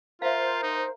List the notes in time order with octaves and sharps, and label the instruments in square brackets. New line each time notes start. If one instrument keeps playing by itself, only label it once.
[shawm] F4 [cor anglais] A#4 [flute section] C5 [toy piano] E5 F5
[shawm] D#4